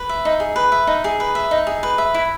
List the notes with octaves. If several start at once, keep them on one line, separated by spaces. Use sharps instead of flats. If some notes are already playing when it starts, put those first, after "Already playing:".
Already playing: B4
E5
D#4
G#4
B4
E5
D#4
G#4
B4
E5
D#4
G#4
B4
E5
E4